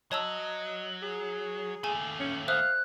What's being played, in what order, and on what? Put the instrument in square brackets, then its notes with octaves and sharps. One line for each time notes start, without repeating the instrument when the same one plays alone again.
[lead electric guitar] F#3 [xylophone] C#5 A5 E6 [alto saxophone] D#5
[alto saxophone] G#4
[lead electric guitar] D#2 A3 [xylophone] G#5
[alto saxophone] C#4
[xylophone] C5 E5 D#6 [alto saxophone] F5 [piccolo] F#6